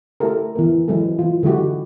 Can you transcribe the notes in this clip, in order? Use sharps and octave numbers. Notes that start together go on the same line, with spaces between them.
A3 E4 G4 A4 A#4
E3 B3 A#4
E3 F#3 G#3 C4 E4 A4
E3 F4
D3 F#3 G#3 E4 F#4 G4